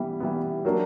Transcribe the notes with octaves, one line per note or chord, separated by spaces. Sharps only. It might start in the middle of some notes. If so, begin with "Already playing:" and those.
Already playing: E3 G3 B3
E3 G3 B3
F#3 A#3 D4